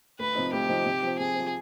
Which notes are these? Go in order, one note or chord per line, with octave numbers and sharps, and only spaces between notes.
D2 B4
C3 F3 C4 D#4
D2 G4
C3 F3 C4 D#4
C3
F3 C4
C3 G#4
F3 C4